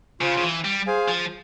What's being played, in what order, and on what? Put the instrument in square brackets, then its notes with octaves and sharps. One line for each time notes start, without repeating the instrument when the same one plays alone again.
[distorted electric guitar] C#3 [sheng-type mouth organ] F4 C5 F5
[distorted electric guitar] C#3
E3
G3
[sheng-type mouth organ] G#4 C5 F5 G#5
[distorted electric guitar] F3